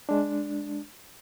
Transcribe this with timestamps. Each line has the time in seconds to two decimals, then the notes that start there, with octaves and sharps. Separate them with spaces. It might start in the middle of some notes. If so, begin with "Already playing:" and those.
0.09 G#3 D4